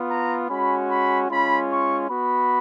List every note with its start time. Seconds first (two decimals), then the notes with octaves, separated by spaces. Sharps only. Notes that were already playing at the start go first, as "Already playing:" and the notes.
Already playing: B3 F4
0.08 A#5
0.49 G#3 C#4 F#4 B5
0.89 B5
1.28 G#3 C#4 F4 B5
1.69 C#6
2.08 B3 F#4 B5